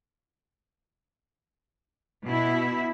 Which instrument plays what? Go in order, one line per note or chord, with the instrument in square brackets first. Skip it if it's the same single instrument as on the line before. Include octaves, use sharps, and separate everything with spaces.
[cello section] B2 E4